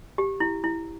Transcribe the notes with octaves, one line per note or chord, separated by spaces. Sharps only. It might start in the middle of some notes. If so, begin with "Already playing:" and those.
G4
E4
E4